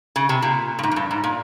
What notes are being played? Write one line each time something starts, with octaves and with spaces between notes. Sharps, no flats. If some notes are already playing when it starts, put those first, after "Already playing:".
C#3
C3
A#2
G2
G#2
F2
G2
G#2
A#2